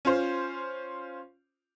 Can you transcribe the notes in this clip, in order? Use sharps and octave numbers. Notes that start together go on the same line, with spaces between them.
C#4 F4 C5